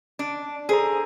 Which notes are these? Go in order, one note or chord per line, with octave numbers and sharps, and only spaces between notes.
D4
G#4 A4 C5 A#5